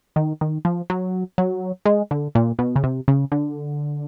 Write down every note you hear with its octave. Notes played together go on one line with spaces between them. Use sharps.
D#3
D#3
F3
F#3
F#3
G#3
D3
A#2
B2
C#3
C3
C#3
D3